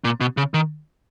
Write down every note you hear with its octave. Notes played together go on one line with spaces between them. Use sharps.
A#2
B2
C#3
D#3